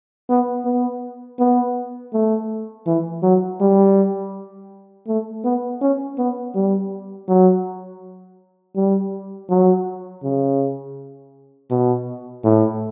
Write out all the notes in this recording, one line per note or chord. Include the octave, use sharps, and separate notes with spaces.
B3
B3
B3
A3
E3
F#3
G3
A3
B3
C#4
B3
G3
F#3
G3
F#3
C#3
B2
A2